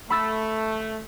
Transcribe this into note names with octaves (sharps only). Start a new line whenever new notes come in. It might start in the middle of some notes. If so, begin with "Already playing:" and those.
A3 B5 E6 A6